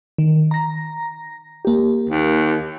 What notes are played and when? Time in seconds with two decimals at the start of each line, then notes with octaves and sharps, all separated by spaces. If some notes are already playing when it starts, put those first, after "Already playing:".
0.18 D#3
0.51 A#5 A#6
1.65 A#3 G4
2.09 D#2